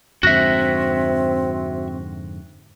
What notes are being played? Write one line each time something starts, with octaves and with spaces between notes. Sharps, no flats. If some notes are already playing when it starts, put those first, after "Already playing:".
F2 G#2 D3 C4 F#4 E5 F#6 A#6